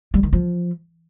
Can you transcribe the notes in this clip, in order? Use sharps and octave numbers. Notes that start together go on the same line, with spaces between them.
G3
D#3
F3